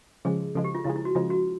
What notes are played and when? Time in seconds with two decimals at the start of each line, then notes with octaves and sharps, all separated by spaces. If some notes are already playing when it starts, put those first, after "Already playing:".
0.25 C#3 F3 G#3 G#4
0.55 C#3 F3 G#3 A4
0.64 G4
0.75 F4
0.85 C#3 F3 G#3 E4
0.96 E4
1.05 F#4
1.15 C#3 F3 G#3 F4
1.30 F#4